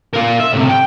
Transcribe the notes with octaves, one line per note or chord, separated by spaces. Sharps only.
F4 A#4
E5
A2 C3
G5